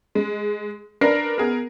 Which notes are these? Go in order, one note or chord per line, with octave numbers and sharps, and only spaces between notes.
G#3
D4 A#4 B4 A#6 C7
B3 G#4 A#4